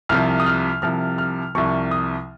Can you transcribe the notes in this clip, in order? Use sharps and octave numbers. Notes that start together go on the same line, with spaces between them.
C2 C3 F3 F6
D#6
F6
C2 C3 F3 F6
F6
C2 C3 F3 C#6
D#6